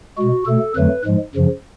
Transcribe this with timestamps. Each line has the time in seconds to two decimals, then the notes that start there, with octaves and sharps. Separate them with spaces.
0.18 B2 G#3 F#4
0.47 B2 A3 A4
0.76 F2 D3 F#3 A3 B4
1.05 G#2 F3 G#3
1.35 F#2 C#3 F3